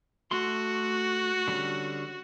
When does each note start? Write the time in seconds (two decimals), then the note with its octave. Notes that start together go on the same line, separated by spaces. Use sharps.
0.31 A3 F#4 C6
1.48 D3 G3 C#4